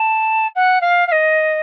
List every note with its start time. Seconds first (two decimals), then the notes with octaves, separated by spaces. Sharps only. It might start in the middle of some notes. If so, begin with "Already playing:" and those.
Already playing: A5
0.55 F#5
0.81 F5
1.07 F5
1.12 D#5